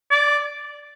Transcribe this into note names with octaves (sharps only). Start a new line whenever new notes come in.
D5